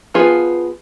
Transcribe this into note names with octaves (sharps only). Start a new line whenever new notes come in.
F3 B3 F4 G#4 B4